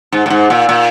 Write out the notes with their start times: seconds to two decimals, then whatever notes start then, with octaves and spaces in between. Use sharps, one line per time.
0.12 G#2
0.26 A2
0.30 G#2
0.50 A#2
0.69 A#2